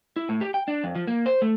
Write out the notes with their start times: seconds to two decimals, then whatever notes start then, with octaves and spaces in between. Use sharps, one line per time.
0.16 E4
0.29 A2
0.41 G4
0.54 G5
0.68 D4
0.84 F2
0.95 F3
1.07 A#3
1.26 C5
1.42 A3